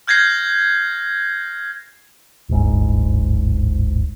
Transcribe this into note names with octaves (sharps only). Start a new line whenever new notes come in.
F6 G6 G#6 A#6 C7
D1 G1 G#2